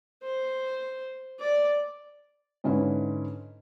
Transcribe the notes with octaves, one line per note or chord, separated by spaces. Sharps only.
C5
D5
G#2 D3 C#4 E4 B4